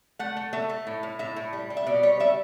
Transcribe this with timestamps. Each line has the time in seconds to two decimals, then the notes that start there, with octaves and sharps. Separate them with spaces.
0.19 A3 F#5
0.37 A3
0.53 A3 E5
0.69 A3
0.87 A2
1.03 A2
1.19 A2 E5
1.36 A2
1.53 G3
1.70 G3
1.77 E5
1.86 B2 D5
2.03 G3 C#5
2.20 G3 E5